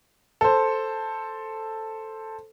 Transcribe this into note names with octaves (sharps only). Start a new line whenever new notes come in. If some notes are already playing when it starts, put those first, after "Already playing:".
A4 C5